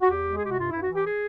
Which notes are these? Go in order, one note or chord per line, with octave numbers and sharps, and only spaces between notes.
F#4
E2 G4
G#3
G#4
C3 G4
F#4
G2 F4
E4
G2
F#4
E3 G4
G#4